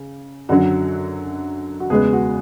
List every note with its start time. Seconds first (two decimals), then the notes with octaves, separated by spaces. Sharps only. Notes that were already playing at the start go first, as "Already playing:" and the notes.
Already playing: C#3
0.49 F#2 D3 F#3 F#4
1.80 F#4
1.90 E2 C#3 G#3 B3 G#4
2.13 F#4